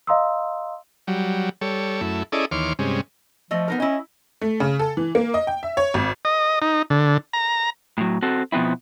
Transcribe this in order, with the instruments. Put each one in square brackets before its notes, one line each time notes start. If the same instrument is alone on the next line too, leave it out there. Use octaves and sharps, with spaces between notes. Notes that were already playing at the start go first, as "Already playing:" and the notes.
[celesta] D#5 F5 A#5 C6 D#6 E6
[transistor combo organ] F#3 G3
G3 A4 C#5
F#2 A3 E4
C#4 E4 G#4 A4 D5 D#5
D#2 E3 C#5 C6 D6 F6
G2 C3 G#3 C#4
[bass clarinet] F3 [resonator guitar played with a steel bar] A3 D#5
[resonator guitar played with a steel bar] B3 D#4 A#4
[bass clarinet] C#4 [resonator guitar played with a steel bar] E4 D#5
[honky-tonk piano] A3
C#3
A4
E3
A#3
D#5
G5
E5
C#5
G#1
[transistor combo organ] D#5
D#4
D3
A#5
[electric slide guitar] A2 F#3
C4 F#4 A4
B2 F3 B3 C4 E4